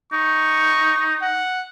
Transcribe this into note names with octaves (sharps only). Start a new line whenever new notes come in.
D#4 C#6
F#5